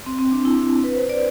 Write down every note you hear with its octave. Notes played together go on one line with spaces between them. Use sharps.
C4
C4
D4
E4
B4
C5
D5